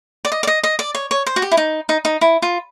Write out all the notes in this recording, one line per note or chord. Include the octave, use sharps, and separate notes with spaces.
D5
D#5
D5
D#5
D#5
D5
C#5
C#5
C5
F#4
G4
E4
D#4
D#4
D#4
E4
F4